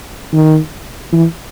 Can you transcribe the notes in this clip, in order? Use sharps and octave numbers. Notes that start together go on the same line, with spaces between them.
D#3
E3